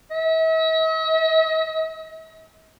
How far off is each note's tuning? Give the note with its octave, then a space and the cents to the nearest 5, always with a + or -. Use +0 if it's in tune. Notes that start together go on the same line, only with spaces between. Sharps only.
E5 -45